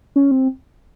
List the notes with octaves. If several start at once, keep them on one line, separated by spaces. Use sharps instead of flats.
C#4
C4